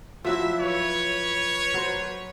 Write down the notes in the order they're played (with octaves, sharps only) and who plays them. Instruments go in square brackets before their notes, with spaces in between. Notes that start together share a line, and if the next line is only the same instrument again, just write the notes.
[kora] F3 F#3 E4 [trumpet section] E5
[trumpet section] B4 C#5
[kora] F#3 C5